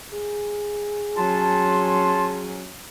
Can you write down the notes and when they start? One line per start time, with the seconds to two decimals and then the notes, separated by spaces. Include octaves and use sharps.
0.12 G#4
1.17 F#3 C#4 A5 C6